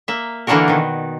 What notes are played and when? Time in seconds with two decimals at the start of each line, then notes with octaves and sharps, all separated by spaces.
0.08 A#3 E5
0.47 D3 E3 A#3 D4 F#4 A#4
0.68 B2 D#3